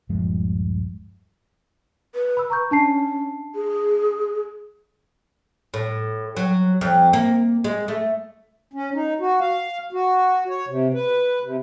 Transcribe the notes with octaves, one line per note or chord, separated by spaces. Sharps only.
D#1 G2 F3 G#3
B4
B5 E6
A#5 C#6 G6
C#4 D4 A5 C7
G#4
A2
F#3
F2
A#3
G#3
A3
C#4
D#4
F#4
F5
F#4
C#5
C3
B4
C3